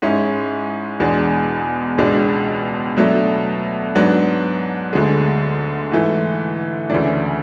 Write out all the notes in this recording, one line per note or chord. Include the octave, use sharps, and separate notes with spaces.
G#2 G#3 C#4 E4
E2 B2 G#3 D4
C#2 B2 G#3 D4
B2 F#3 A3 D4
G#2 F#3 B3 D4
D2 D3 G#3
G#2 E3 A3
D2 C#3 E3 A3 D4